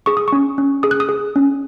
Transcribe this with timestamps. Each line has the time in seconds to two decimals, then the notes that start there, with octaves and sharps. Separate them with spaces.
0.06 G#4 C#6
0.17 D#6
0.28 C#4 C#6
0.58 C#4
0.83 G#4 D#6
0.91 F#6
1.00 D#6
1.09 G#4
1.36 C#4